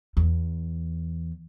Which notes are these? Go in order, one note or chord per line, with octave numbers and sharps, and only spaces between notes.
E2